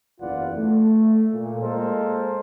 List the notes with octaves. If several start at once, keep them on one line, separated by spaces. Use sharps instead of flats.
F#1 E2 F4 B4 D5 F#5
A3
A#2
G#3 A#3 A4 A#4 C5